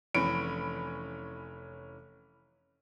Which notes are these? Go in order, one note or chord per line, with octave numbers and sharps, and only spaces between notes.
F1 E3 C#4 B5 D7